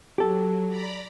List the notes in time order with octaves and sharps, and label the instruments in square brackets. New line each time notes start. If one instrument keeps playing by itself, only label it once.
[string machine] F#3 [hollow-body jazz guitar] G4 A4
[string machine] D5 A#5 B5